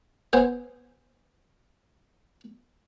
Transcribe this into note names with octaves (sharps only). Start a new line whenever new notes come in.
B3 G#4 C5